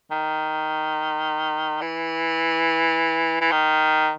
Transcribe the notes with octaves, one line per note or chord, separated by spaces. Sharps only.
D#3
E3
E3
D#3